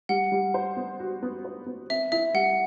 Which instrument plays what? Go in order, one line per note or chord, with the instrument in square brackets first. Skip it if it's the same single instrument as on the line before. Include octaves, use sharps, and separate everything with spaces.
[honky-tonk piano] G3 [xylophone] F#5
[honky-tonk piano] G3
C5
B3
F#4
B3
C5
B3
[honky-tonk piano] C4 [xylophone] E5
[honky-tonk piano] E4 [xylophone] E5
[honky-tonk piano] G3 [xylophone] F#5